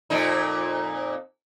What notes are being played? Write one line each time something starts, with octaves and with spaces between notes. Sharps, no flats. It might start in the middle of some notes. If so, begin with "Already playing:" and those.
F2 A#2 D#4